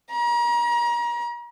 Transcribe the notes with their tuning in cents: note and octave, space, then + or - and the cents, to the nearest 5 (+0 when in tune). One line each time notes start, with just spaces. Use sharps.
A#5 +35